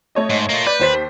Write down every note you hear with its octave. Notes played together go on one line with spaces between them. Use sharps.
A3 C#5 D#5
G#2
A#3 F4
B4 D5 G6
D#2 C5 B6